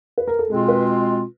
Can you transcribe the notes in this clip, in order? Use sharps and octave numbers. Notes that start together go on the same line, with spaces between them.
B4
A#4
A4
B2 G#3 C4 F4 G#4
B4